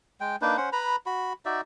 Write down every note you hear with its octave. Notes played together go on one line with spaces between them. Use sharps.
G#3 G5
A#3 D4 D#4 B4
C#4 C5 F#5
B4 A#5 B5
F#4 B5
D#4 F#4 D5 E5